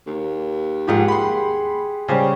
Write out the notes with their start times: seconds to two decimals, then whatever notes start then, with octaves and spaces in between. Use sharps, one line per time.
0.07 D#2
0.88 G#2 F3 G4 G#4 F#5
1.08 B5 C6
2.08 C#3 G3 G4 C5 C#5